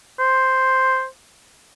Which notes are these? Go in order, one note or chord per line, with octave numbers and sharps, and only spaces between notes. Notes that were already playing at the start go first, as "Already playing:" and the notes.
C5